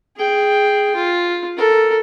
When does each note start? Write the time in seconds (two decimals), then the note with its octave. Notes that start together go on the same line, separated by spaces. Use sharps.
0.16 G#4 G5
0.95 F4
1.58 A4 A#4